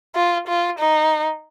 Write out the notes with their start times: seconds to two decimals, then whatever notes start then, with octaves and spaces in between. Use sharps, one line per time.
0.15 F4
0.48 F4
0.79 D#4